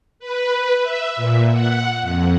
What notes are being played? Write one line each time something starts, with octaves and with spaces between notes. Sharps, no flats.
B4
E5
A#2
F#5
F2